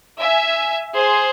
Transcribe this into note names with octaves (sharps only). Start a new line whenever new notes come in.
E5 G#5
G#4 C5